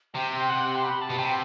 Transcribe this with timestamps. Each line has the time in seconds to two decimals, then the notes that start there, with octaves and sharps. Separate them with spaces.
0.14 C3 G5
0.49 F#5
0.67 G5
0.75 C6
0.84 B5
1.01 A5
1.10 B2
1.18 C3 G5